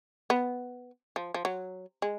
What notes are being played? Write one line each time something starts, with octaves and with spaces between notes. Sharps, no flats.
B3
F3
F3
F#3
G#3